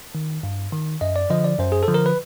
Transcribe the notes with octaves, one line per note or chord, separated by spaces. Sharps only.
D#3
G2
D#3
F#2 D#5
D5
D3 F3 D#5
D5
F#2 C5
G#4
A4
D3 F3
A#4
B4